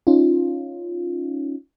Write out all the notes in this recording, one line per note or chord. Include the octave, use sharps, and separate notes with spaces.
C#4 D#4 F4